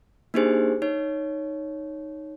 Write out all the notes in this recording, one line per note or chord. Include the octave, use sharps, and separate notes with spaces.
A#3 D4 D#4 G4 G#4 C5
D#4 C#5